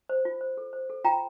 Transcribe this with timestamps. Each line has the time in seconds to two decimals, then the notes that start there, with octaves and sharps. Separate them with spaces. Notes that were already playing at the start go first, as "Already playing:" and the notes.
0.09 C5
0.25 F4
0.41 C5
0.57 A4
0.73 C5
0.90 A4
1.04 F4 G5 A#5